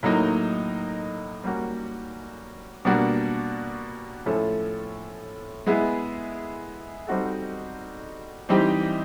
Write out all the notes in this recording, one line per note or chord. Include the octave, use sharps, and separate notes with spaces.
A2 F#3 A#3 D#4
G3 A#3 C#4 F#4
B2 G3 A#3 D4 F#4
A2 F3 A3 C#4
G#3 B3 E4 G#4
G3 C4 D#4 F#4 A4
E3 G3 C4 D#4 G4